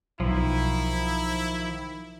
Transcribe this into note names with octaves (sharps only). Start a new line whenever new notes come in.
B1 D#3 F3 E4